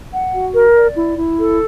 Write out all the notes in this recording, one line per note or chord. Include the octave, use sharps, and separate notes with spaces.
F#5
F#4
A#4
D5
E4
E4
A4